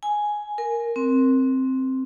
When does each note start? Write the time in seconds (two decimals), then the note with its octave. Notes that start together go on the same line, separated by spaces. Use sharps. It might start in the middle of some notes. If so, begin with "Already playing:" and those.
0.03 G#5
0.58 A#4
0.96 C4